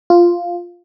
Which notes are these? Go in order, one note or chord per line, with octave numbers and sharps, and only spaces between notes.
F4